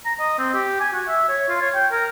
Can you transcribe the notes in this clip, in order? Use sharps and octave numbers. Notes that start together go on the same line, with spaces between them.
A#5
D#5
C4
G4
G#5
F#4
E5
C#5
F4
C#5
G5
A#4